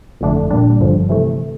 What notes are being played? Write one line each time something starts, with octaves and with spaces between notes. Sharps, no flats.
G1 F2 D3 A3 D4
A#1 A#2 G3 D4
G1 G2 D3 F3
C3 E3 A3